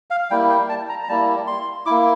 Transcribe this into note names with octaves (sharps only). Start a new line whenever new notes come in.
F5
G3 A#3 E4 G5
G5
A5
A#5
A#5
G3 A#3 E4 A5
C6
A#3 E4 D6